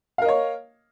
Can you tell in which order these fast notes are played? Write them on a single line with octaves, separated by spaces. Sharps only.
F5 A#4 D#5 C#5